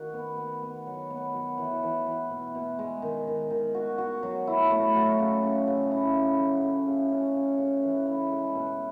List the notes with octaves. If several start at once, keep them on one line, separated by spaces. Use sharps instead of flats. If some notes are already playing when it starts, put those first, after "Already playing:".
Already playing: D#3 F#4
B3
B3
B3
F#3
B3
F#3
E3
E3
E3
B2
B2
G#3
D#3
D#3
D#3
F#4
F#4
F#3
E4
A3
F#3
C#3
C#3
C#3
E4
E4
F#3
C#3
C#3
C#4
C#3
C#3
E3
E4
G#3
B2